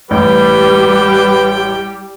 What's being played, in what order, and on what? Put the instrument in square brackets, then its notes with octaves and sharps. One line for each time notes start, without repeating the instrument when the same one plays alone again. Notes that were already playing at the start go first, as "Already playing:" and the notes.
[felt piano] A1 [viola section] G3 G4 [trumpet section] B4 [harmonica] G5